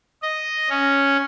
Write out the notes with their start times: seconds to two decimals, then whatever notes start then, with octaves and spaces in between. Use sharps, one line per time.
0.22 D#5
0.69 C#4